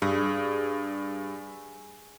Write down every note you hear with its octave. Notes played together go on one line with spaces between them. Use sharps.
G2 G#4